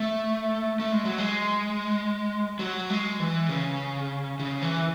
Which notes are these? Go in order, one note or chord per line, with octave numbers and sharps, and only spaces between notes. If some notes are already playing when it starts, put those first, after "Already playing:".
Already playing: A3
A3
G#3
F#3
G#3
F#3
G#3
E3
C#3
C#3
E3